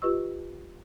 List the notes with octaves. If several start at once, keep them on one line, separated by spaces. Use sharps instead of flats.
F4 G4 B4 D#5 C#6 E6